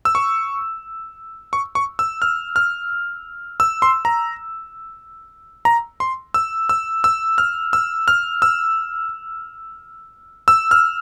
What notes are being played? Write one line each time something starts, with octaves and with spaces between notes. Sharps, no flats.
E6
C#6
C#6
C#6
E6
F6
F6
E6
C6
A#5
A#5
C6
E6
E6
E6
F6
E6
F6
E6
E6
F6